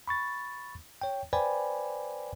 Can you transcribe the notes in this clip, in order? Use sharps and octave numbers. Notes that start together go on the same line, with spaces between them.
B5 C#6 A6
C#5 G5
B4 C5 D5 G5 G#5 B5